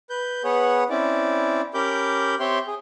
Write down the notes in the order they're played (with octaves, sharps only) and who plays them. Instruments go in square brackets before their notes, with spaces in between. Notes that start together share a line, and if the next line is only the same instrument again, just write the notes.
[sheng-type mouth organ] B4 G6
B3 G#4 B4 C#5 F#5
C4 C#4 E4 D5
C#4 G4 A#4 B5 D6 G6
C4 G4 C#5 E5 G5 C6
G#4